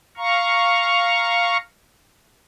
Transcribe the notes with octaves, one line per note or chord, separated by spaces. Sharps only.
F5 A#5 C#6